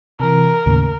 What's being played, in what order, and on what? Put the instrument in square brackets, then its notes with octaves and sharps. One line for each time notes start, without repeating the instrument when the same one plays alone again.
[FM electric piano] C3 E3 [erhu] A#4
[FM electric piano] D#2 A2 C#3